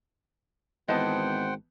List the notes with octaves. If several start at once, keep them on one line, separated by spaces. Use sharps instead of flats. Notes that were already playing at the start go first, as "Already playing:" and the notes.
G#1 E3 B3 C5 D#5 F#5 G5 A5